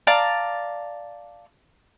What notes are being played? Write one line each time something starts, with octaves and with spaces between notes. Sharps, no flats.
D5 F5 A5 A#5